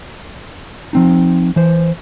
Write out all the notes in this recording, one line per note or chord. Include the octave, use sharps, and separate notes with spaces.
F3 C4 D#4
E3 C5